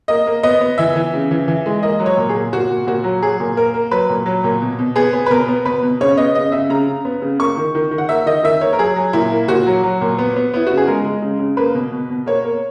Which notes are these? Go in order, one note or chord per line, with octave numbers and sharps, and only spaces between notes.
A#3 D#5
A#3
B3 D#5
B3
E3 E5
E3
C#3
E3
E3
G#3
A#3 D#5
F#3
C#5
A#2
G#4
A#2
A#2 F#4
A#2
A#2 F#4
F#3
F#3 G#4
A#2
A#3 A#4
A#3
F#3 B4
A#2
F#3
A#2
B2
B2
B3 G#4
B3
B4
B2 A#4
B3
B2 B4
B2
C#3 C#5
B3 D#5
C#3 D#5
C#3 E5
C#3 A#5
C#3
B3
C#3
A#3 C#6
D#3
D#3
D#3
F#5
A#3 E5
D#3 D#5
D#3 E5
A#3 C#5
A#4
F#3 G#4
F#3
A#2 E4
A#3
A#2 F#4
F#3
F#3
A#2
B3
B3
B3 E4
C#3 F#4
G#4
G#3 A#4
G#3
C#3
C#3
A#3 B4
B2
B2
B2
A#3 C#5
A#3